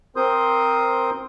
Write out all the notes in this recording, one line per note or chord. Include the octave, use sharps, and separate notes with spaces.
C4 A#4 C5 C6 D#6 G6